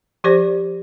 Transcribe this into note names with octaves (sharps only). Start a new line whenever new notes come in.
F3 G4 C5 D5